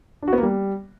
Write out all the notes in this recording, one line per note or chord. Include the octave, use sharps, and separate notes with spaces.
D4
F#4
B3
A#3
G3